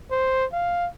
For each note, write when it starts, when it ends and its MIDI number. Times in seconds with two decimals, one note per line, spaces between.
0.11 0.45 72
0.52 0.88 77